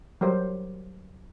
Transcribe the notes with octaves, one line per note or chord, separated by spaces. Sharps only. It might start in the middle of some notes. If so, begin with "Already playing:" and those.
F#3 G3 G4 A#4 C5